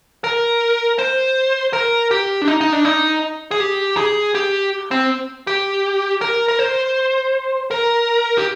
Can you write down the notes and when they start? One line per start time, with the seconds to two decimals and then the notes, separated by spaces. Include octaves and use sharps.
0.24 A#4
0.99 C5
1.73 A#4
2.11 G4
2.42 D4
2.48 D#4
2.61 D#4
2.73 D4
2.85 D#4
3.51 G#4
3.60 G4
3.97 G#4
4.35 G4
4.91 C4
5.47 G4
6.21 A#4
6.49 A#4
6.59 C5
7.71 A#4
8.37 G4